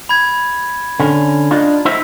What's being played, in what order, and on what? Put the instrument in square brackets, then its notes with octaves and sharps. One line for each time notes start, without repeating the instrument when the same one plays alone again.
[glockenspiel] B5 G#6
[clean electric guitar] D3 C#4
D4 D#4 F4
D#4 C5 E5